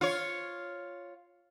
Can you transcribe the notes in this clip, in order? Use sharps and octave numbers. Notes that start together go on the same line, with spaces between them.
F4 C#5